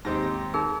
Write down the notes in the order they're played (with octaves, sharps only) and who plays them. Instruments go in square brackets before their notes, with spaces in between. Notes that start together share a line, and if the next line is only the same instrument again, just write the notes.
[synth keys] D#2 G4 A#6 [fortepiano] G#2 C4 D#4
[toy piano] D#4 G#4 A#4